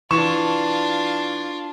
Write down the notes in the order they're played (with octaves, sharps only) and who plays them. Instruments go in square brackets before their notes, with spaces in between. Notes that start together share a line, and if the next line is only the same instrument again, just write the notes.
[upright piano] E3 C#6 E7 [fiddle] D4 F4